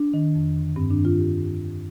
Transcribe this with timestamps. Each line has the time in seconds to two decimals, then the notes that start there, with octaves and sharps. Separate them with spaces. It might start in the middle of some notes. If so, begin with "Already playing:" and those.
Already playing: D4
0.14 D#3
0.35 F2
0.56 D3
0.76 G2 C4
0.90 D4
0.98 D#3
1.05 F4
1.19 G4